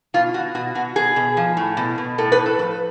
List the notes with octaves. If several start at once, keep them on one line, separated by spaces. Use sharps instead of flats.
B2 F4
B2 F#4
B2 F#4
B2 F#4
B2 G#4
B2
F3
A2
B2
B2
A2 A4
B4
A2
A4
F3 B4